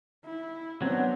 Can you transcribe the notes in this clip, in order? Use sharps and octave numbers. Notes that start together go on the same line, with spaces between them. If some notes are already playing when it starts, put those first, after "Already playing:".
E4
F#3 B3 C4 D4 F#4 F#5